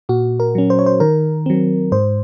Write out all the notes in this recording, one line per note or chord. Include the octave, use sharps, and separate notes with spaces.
A#2 F#4
A#4
F#3 C#4
C5
C#5
C5
D#3 A#4
F#3 C4
G#2 C5